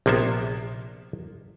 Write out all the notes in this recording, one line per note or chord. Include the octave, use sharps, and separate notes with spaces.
A#1 C3 A#3 B3 E5